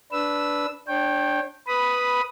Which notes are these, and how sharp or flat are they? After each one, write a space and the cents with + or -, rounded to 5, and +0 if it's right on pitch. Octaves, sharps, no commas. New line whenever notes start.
D4 -10 B4 +0 E6 -5
D4 +0 C#5 -35 G5 +0
B4 +0 B5 -5 D#6 +5